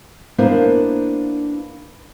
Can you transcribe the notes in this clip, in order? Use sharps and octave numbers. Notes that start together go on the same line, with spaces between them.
A#3 B3 D4 E4 A#4 C5